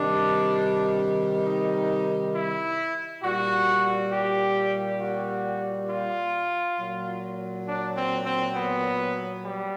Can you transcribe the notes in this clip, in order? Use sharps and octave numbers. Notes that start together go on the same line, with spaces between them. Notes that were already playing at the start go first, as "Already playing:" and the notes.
Already playing: C3 D#3 G3 D4
D#4
E4
A#2 G3 F#4
G4
F#4
F4
A#2 F#3
D4
C4
C4
B3
G3